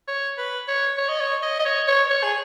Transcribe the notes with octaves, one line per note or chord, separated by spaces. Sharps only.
C#5
B4
C#5
C#5
D#5
C#5
D#5
D#5
C#5
C#5
C#5
G#4